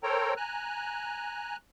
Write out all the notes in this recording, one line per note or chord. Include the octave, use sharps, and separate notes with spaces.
A4 A#4 C5 C#5 G5 A#5
G#5 A#5 F#6